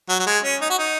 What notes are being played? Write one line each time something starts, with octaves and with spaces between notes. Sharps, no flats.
F#3
F#3
G#3
C#4
D#4
F#4
D#4